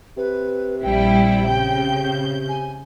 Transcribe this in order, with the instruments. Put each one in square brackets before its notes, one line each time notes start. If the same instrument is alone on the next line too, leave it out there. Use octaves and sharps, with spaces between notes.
[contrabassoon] C3 [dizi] B4
[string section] A#1 G3 E4 [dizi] G5
[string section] C#3 G6
[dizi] G#5